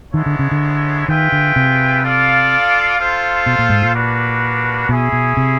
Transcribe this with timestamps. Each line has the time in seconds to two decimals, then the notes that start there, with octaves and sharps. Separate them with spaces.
0.13 D#3 G#3 B3 E4 A4 C#5
0.26 D3
0.39 C#3
0.51 D3
1.08 D#3 F4 G#4 B4 E5 G5
1.32 D3
1.56 C3
2.03 F4 A4 D5 F5
2.99 F4 A4 C5 F5
3.46 B2
3.59 A#2
3.69 G#2
3.82 A#2
3.93 G3 A#3 D4 F#4 B4
4.89 B2 C#4 E4 G#4
5.12 B2
5.37 C3